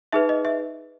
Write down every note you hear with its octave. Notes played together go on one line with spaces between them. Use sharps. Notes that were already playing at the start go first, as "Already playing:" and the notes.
D#4 G#4 B4 E5
D#5
E5